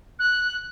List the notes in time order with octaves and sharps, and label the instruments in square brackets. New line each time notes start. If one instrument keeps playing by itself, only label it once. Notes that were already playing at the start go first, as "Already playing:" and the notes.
[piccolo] F#6